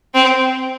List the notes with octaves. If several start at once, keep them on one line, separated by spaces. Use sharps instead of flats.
C4